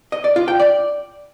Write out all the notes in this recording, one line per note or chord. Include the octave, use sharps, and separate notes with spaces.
D#5
D5
F4
G5
D5